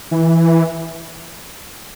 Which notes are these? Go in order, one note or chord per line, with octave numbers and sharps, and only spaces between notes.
E3